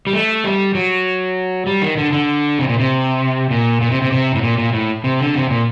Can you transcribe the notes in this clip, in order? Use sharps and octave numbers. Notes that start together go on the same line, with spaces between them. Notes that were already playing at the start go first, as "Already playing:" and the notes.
G3
A3
G3
F#3
G3
D#3
D3
D3
C3
A#2
C3
A#2
A#2
C3
C3
C3
A2
A#2
A#2
A2
C3
D3
C3
A#2